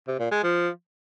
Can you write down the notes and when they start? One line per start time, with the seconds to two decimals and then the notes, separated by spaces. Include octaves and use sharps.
0.07 C3
0.19 A#2
0.31 G#3
0.43 F3